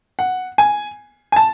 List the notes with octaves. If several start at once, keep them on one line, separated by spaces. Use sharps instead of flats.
F#5
G#5
G#5
A5